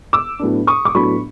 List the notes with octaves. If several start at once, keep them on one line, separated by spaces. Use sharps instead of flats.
D6 E6
A2 F#3 B3 D4
C#6 D#6
D6
A2 F#3 B3 D4 B5 C#6